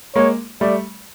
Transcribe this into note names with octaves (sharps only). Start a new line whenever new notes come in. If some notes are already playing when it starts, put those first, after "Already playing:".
G#3 A#3 C#5
G3 A3 D5